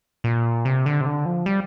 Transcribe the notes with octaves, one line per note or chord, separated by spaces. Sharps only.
A#2
C3
D3
C3
D3
F3
G3